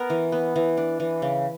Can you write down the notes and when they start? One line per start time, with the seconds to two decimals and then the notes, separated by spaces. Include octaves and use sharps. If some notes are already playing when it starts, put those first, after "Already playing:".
Already playing: B3 A#4
0.10 E3
0.32 B3
0.56 E3
0.77 D4
1.00 E3
1.22 C#3